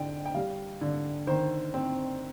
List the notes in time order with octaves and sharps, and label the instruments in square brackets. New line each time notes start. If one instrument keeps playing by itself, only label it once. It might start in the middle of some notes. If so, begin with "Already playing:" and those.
Already playing: [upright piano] D3 G5
G5
G3 F5
D3
D#3 C5
C4